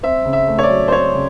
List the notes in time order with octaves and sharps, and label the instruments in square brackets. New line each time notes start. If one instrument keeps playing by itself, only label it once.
[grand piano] C4 E5
C#3
E5
A3
C#5
D5
F#3
C5
C4 C#5
C#3